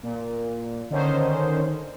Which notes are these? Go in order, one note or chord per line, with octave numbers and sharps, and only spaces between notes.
A#2
D3 D#3 C#4 D#4 C5